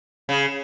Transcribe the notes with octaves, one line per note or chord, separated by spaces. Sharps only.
C#3